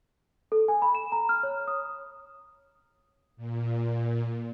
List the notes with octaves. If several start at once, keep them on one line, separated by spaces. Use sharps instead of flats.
A4
G#5
B5
E7
A#5
F6
C#5
D#6
A#2